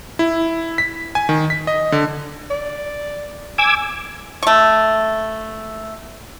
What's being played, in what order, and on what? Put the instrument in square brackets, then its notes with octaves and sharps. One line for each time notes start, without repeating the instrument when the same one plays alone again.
[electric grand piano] E4
B6
G#5
D#3
B6
D#5
D3
[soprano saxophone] D5
[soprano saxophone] G#5 [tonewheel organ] D6 E6 G#6
[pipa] A3 C#6